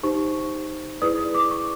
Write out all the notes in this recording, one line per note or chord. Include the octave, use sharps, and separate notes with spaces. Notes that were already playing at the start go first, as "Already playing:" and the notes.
D#4 G4 C5 C#6
E4 G#4 B4 D5 D#6
D#6
D6
C#6